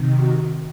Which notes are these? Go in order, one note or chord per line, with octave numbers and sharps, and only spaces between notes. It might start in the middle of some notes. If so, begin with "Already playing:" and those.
Already playing: C3 D#3
F#4